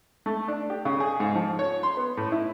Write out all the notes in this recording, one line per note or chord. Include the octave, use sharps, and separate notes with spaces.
A3
D4
G4
C#3
G#4
G#2
F3
C#5
C6
B3
A2
E4